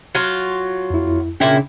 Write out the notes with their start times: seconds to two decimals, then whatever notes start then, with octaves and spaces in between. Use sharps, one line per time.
0.15 F#3 F4
0.90 F2 E4
1.40 A#2 C#3 C#4 D4 E4 G5